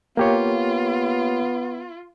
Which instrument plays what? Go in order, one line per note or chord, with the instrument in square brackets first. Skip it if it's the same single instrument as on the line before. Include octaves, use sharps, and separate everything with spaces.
[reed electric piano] A#3 G4 C#5 [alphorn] B3 [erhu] F4